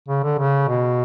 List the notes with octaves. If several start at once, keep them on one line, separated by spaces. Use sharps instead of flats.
C#3
D3
C#3
B2